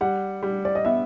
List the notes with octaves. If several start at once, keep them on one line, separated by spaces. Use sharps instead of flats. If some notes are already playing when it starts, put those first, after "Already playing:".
G3 F#5
G3
D5
D#5
B3 E5